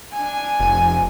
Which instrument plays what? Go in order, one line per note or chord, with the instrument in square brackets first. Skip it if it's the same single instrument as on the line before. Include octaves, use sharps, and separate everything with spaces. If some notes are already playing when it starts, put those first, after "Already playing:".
[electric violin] D4 G#5
[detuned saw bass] F1